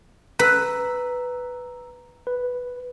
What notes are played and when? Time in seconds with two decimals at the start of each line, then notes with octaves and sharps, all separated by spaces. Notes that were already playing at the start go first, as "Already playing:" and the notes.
0.39 B4 A#5 E6
2.27 B4